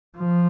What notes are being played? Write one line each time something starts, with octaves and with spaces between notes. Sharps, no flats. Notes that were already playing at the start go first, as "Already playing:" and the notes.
F3